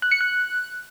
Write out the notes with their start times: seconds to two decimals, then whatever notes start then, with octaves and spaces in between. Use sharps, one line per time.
0.02 F#6
0.11 C#7
0.21 F#6